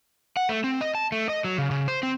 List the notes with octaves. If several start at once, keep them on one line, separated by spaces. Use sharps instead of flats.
F#5
A3
C4
D#5
A5
A3
D#5
F#3
C#3
C#3
C5
C4